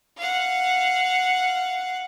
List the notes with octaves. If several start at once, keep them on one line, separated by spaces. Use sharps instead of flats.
F5 F#5